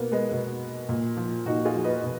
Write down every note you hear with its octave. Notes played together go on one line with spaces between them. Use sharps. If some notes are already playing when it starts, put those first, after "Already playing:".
Already playing: B2 A#3 B3
G#3 B3
B2
A#2
F3
A#2 D#4 F#4
F4 G#4
F3
B4 D#5
B2